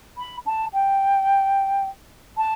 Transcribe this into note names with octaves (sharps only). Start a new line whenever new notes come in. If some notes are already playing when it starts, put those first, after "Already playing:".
B5
A5
G5
A5